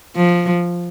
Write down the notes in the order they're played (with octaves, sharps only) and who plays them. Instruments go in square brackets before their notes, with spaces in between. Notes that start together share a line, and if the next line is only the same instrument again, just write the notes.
[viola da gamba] F3